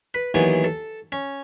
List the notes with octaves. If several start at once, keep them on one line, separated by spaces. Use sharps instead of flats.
B4
D#2 E3 F#3 B3 G#5
A4
C#4